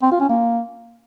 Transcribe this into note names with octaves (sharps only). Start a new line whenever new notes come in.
C4
F4
C#4
A#3